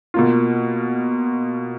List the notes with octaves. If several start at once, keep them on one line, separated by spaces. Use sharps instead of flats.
B2 A#3 F4